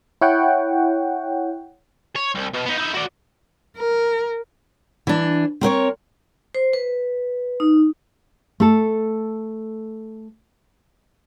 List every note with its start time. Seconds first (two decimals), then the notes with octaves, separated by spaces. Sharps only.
0.21 E4 C#5 F#5 G5
2.16 C#5
2.35 C2
2.53 B2
2.66 B3 D#4
2.77 D#4 E4
2.94 F#4 D5
3.77 A#4
5.07 E3 D4
5.61 C4 A#4 C5 C#5
6.55 C5
6.73 B4
7.60 D#4
8.60 A3 A4